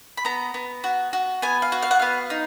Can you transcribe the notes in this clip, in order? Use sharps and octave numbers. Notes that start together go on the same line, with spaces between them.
B5
B3 A#5
B3
F#4
F#4
B3 G#5
F5
F#4
F5
F#5
B3 F5
D#4